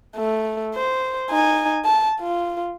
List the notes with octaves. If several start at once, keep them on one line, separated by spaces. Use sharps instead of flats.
A3
C5
D#4 G#5
A5
F4